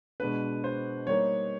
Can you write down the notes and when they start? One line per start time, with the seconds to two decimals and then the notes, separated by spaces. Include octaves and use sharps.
0.20 B2 G#3 B3 D4 B4
0.64 C5
1.07 G3 A#3 D#4 C#5